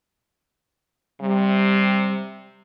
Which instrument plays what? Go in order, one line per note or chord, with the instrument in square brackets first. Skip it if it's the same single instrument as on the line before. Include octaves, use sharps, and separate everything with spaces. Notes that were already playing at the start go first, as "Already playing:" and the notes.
[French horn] C3 [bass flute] G3